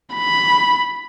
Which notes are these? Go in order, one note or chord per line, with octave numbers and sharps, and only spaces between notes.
B5